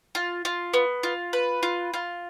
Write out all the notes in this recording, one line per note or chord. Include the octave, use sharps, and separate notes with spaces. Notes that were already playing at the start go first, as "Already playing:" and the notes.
F4
F4
B3
F4
B4
F4
F4